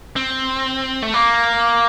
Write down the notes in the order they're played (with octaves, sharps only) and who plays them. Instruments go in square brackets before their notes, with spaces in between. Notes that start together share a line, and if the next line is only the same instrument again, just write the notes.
[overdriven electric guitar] C4
A3
A#3